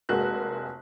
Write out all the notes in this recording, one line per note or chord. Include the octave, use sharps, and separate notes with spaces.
F1 G#3 A#3 F#4 F#6